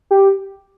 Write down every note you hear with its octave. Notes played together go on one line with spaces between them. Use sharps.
G4